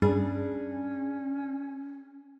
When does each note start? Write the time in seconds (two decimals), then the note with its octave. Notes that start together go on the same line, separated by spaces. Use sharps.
0.02 G2 C#4 D4 G#4